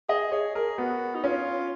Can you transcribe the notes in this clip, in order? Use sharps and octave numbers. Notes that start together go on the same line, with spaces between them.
G#4 D#5
G#4 C#5
G#4 A#4
B3 F#4
D#4
C#4 F4